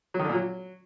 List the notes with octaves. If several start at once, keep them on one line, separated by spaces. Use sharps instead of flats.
F#3
D#3
D3
A#2
F#3